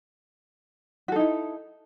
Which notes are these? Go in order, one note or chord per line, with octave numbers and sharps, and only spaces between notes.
D#4 E4 F#4 A4